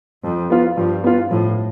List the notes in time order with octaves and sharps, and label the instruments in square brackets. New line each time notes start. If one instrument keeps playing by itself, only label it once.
[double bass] F2 [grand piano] F3
[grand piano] B3 F4
[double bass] G2 [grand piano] F3
[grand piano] B3 F4
[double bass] A2 [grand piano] F3